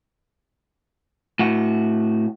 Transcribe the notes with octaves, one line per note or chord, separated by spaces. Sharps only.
A2 F#4